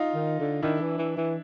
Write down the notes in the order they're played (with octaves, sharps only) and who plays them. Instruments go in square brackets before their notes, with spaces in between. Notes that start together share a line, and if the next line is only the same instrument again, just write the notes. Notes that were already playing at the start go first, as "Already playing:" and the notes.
Already playing: [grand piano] D#4 F4
[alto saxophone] D#3
D3
[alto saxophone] D#3 [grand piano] D4 E4
[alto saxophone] E3
E3
E3